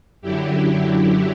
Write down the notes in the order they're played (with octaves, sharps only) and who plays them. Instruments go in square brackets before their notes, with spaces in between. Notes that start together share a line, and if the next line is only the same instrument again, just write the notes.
[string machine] F#2 D3 F#3 E4 G4